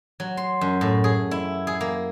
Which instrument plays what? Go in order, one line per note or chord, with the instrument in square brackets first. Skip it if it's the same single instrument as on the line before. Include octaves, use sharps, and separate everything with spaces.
[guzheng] F#3
C6
F#2
A2
G#4
E4
G#4
A#3